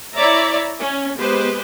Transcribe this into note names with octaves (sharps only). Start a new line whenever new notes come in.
E4 C#5 D5 E5 A#5
C#4
G#3 B3 G4 B4 C5